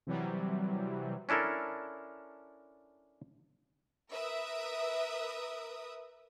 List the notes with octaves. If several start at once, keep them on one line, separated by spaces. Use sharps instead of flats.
C3 E3 F#3 G3
C#4 D4 E4 A4 A#4
A#4 B4 E5 D#6